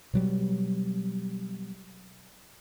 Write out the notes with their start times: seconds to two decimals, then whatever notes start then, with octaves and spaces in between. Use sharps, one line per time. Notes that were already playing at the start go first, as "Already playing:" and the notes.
0.14 B2 F#3 G3